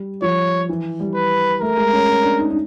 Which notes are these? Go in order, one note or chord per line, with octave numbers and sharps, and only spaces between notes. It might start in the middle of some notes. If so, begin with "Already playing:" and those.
Already playing: G3
F3 C#5
E3
G3
B4
A3 A#4
G#3
C#4
C#4
D4
D#4
D#4